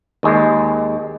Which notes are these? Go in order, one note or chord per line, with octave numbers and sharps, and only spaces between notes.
D#2 G#3